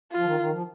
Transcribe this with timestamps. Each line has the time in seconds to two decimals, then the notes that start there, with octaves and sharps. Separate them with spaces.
0.12 F4
0.18 F3
0.25 D#3
0.40 D#3
0.51 F3